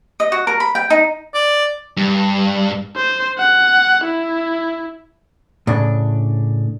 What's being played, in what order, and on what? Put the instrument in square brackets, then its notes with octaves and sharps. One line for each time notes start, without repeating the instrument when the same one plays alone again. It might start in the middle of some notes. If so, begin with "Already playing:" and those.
[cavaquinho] D#5
F#4
A#4
B5
G5
D#4
[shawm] D5
[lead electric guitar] G2
[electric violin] C5
F#5
E4
[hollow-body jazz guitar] A2 C#3 D4